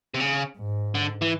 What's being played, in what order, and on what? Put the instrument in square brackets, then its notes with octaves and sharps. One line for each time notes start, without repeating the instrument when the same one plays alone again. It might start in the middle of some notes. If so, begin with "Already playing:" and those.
[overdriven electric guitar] C3
C#3
[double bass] G#2
[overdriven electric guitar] D3
E3